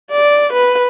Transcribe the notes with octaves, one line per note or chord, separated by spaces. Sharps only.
D5
B4